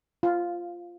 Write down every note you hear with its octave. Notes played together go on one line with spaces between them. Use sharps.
F4